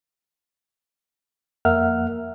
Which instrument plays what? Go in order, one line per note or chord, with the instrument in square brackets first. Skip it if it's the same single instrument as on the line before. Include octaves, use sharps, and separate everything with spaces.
[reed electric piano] F2 A#3 A#4 E5 F#5 F6